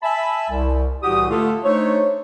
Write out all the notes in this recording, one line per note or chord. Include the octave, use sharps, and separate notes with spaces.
E5 G#5 A5 B5
C2
C2 A2 E3 F#4 G4 D#6
D3 A3 F4 A4
A3 D4 D#4 C5 C#5